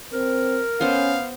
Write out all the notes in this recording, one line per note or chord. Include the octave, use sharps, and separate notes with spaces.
C4 A#4
B3 C#4 C5 F5